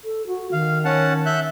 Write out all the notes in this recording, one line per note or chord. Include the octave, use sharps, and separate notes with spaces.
A4
F#4
D#3 F5
C#4 F#5 A5
E5 F#6 G6